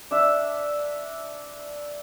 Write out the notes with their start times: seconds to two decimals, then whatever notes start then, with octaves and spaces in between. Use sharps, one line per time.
0.11 D4 E5